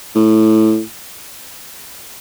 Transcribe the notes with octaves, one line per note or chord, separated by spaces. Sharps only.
A2